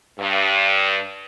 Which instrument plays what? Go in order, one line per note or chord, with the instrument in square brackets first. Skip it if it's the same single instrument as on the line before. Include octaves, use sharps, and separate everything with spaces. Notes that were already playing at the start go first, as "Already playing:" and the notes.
[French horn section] G2